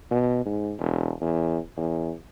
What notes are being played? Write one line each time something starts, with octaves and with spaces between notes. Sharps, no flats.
B2
G#2
E1
E2
E2